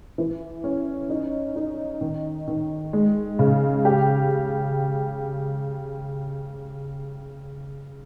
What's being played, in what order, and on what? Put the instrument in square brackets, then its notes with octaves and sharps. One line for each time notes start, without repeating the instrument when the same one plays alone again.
[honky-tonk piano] E3
C#4
D#4
D#4
D#3
D#3
G#3
C#3
G4